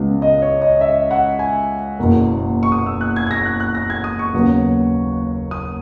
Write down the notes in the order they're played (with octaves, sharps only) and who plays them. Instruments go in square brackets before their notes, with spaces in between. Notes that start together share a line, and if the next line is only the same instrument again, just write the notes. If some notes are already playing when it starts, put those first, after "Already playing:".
Already playing: [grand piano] C#2 C#3 G#3 B3
D#5
C#5
D#5
E5
F#5
G#5
F#1 E2 B2 A#3
C#6
D#6
E6
F#6
G#6
G#6
A#6
F#6
F#6
A#6
G#6
D#6
C#6
D#2 C#3 F#3 B3
D#6